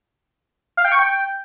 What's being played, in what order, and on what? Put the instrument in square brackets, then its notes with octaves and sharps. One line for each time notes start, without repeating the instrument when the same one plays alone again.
[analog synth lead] F5
G5
C#6
G5